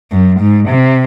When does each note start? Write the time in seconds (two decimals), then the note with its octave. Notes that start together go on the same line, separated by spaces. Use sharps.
0.12 F#2
0.40 G#2
0.69 C3